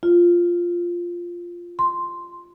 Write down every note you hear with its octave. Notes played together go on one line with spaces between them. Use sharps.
F4
C6